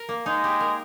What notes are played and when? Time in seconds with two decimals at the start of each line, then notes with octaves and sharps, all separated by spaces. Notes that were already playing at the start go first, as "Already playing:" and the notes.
Already playing: A#4
0.09 A#3
0.26 G#3 D#4
0.44 G4
0.60 A#4